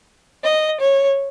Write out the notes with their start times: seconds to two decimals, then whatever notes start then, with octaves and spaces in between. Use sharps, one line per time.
0.44 D#5
0.81 C#5